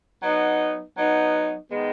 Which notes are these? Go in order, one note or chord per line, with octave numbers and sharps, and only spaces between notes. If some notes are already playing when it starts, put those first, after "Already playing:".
F#3 B3 D#4
F#3 B3 D#4
D#3 G#3 B3